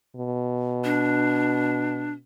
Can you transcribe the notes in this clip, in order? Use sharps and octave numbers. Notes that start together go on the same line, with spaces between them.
B2
D4